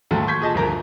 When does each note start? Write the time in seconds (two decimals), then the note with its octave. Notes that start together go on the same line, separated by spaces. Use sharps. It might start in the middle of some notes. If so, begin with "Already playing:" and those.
0.11 D#2 G#2 F#3 A3
0.27 C6 C#6 G6 G#6 B6
0.41 A#2 G#4 D#5 A5
0.55 D1 G2 F3 A#4 A5 A#5